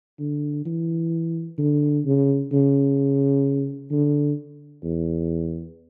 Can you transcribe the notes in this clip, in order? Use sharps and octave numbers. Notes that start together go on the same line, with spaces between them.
D3
E3
D3
C#3
C#3
D3
E2